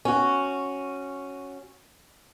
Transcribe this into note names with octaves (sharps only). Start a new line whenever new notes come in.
C#4 F#4